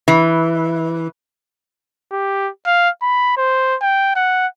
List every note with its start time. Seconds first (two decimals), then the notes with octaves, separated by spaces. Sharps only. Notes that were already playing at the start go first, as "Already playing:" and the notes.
0.08 E3
2.12 G4
2.66 F5
3.02 B5
3.37 C5
3.82 G5
4.16 F#5